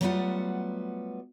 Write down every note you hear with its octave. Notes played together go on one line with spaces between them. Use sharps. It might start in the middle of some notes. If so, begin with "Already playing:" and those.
F#3 G3 A3 B3 F4 F#5